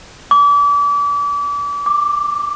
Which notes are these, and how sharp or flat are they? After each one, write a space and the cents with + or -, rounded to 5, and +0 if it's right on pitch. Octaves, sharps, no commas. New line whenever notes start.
D6 -35
D6 +5